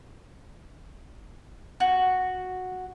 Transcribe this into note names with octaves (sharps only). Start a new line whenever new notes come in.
F#4